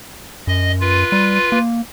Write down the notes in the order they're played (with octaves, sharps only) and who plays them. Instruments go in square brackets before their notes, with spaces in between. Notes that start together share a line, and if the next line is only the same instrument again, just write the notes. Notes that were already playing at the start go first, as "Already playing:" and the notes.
[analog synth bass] F#2 [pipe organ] D#5
[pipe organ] F4 B4
[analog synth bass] G3
A#3